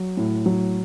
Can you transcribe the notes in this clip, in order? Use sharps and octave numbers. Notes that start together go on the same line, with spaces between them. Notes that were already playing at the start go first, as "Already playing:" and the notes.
Already playing: F#3
A2
F#3